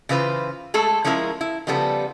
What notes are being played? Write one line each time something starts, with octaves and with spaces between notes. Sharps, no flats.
C#3 E3 F4 B4 C5
G#3 A3 A4
F3 G#3 C#4 E4 A#4
E4
C#3 F3 G3 B3 A4